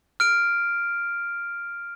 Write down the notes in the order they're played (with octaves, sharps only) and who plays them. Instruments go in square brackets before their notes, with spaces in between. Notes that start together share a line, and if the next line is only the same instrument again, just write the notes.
[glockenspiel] F6 D7